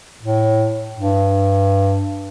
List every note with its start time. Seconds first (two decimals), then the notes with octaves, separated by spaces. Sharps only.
0.23 A2
0.95 G2